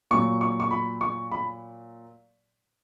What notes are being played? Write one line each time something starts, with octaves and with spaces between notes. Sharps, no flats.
A#2 F#3 C#6
C#6
C#6
B5
C#6
B5